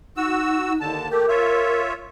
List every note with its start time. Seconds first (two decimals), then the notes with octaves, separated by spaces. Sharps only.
0.17 D#4 F#4 E6
0.81 D#2 D3 A5
1.11 A3 G4 A#4
1.28 F4 C#5 E5